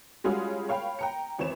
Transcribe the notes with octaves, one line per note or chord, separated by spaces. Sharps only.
G3 G#3 C#4 F4 F#4 G#4
C#5 F5 G5 B5
G5 A#5 C#7
G#1 E2 C4 C#5 E7